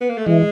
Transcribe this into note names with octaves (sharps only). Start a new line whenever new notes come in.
B3
A#3
A3
E3 G#3